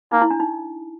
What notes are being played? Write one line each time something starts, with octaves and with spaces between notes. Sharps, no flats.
A#3 D#4
E4
D4
D#4